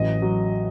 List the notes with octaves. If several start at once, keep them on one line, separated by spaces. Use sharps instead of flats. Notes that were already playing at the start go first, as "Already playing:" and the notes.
Already playing: A1 F#3 D#5
F#3